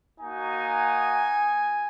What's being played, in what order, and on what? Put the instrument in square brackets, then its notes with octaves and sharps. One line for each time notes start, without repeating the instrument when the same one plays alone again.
[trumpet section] A#3 D#4 F#4 G#5